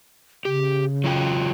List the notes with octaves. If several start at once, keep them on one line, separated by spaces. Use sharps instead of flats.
C#3 G4
F#3 F4 G5